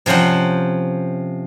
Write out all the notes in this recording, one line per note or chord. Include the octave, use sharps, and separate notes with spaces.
C3 F3 C#4 C5 F#5